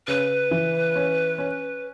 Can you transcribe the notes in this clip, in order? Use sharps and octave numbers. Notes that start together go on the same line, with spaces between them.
C#3 B4
E3
C#4
C#4